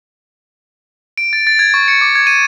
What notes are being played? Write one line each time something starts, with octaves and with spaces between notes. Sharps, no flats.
D7
A6
A6
G#6
C#6
C#7
D6
G#6
D#7